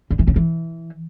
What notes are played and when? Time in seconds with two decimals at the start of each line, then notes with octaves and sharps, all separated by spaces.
0.11 D3
0.19 E3
0.27 C#3
0.36 E3